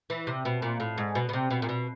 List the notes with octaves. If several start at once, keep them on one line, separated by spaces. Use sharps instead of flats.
E3
C3
B2
A#2
A2
G#2
B2
B2
C3
B2
A#2
B2